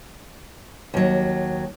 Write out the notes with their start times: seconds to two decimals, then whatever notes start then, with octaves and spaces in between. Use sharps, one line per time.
0.94 D#2 F#3